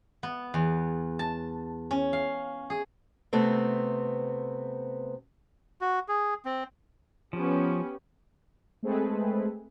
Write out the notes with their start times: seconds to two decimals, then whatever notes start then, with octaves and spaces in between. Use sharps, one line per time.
0.23 B3
0.54 E2
1.19 A5
1.91 C#4
2.13 F5
2.70 G#4
3.33 C3 A3 B3 C4
5.81 F#4
6.08 G#4
6.45 C4
7.33 F3 B3 C#4 G4
8.83 G#3 A3 C4 G#4 A4 B4